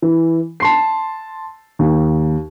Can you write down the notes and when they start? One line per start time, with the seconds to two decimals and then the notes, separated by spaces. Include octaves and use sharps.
0.02 E3
0.60 A5 C6 C7
1.79 D#2